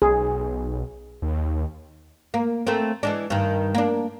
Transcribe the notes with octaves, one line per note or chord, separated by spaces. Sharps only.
B1 G#4
D#2
A#3
A3 A#3 C4
E3 G#3 D4
G2 D#3
A#3 D4